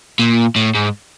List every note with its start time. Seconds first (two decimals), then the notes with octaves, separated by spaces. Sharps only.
0.19 A#2
0.56 A2
0.75 G#2